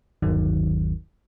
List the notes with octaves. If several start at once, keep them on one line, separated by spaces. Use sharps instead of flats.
G1 D#2 D#3 F#3